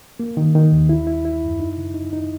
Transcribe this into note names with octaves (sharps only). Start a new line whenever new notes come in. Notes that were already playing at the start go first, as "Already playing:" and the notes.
A#3
D#3
D#3
D#2
E4
E4
E4
F#2
D#4
C#3
D#4
D#4